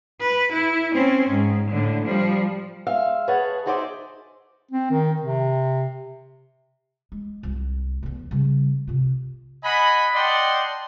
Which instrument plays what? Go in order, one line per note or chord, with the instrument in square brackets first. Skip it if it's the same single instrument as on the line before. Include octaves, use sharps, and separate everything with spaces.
[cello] B4
E4
C4 C#4
G#2
A2 D3
F3 G3
[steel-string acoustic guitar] G#3 E5 F5
G#4 B4 C#5 F5 F#5 A5
D#4 F#4 G#4 C5 D5 E5
[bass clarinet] C4
D#3
C3
[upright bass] G#3
C2 F4
D#1 E2
C#3 G3
C3 F4
[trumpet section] D#5 F#5 G#5 B5
D5 D#5 F#5 G5 A5 C6